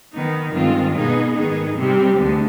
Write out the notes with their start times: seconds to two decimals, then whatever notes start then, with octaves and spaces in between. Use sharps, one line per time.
0.12 D#3 B3 D#4
0.54 G2 D#3 G#3 C4 F4
0.95 B2 B3 D#4 G#4
1.36 G#2 D#3 B3 D#4 G#4
1.77 C3 G3 C4 G4
2.18 D2 D3 G#3